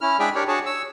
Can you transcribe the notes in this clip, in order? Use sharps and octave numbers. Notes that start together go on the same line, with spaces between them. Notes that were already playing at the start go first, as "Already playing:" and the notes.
C#4 E4 F6
G#3 D4 G#4 D5 E5 G5
D4 G4 A#4 C#5 D5
D4 F#4 G#4 C#5 A5
C#5 E6